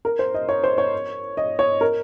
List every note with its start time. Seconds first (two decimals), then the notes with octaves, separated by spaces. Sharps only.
0.05 A#4
0.19 C5
0.34 D#5
0.49 C#5
0.64 C5
0.78 C#5
1.37 D#5
1.59 C#5
1.81 A#4